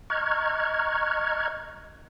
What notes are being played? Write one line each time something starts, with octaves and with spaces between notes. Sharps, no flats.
D#5 A#5 C#6 F6 F#6 G#6